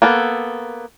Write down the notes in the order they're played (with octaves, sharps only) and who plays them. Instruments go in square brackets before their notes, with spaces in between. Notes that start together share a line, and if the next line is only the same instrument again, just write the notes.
[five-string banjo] A#3 B3 A4